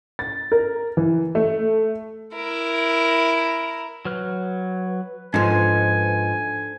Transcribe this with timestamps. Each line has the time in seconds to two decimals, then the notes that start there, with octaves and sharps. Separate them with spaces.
0.19 A6
0.52 A#4
0.97 E3
1.35 A3
2.36 E4 A#4
4.05 F#3 B4 F6 F#6
5.34 G#2 F3 D4 A4 C5 G#5